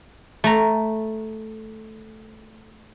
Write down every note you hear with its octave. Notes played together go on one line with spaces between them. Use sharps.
A3 A#5